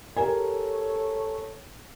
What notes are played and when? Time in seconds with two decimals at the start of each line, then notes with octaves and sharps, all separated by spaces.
0.17 G4 A4 A#4 C#5 G#5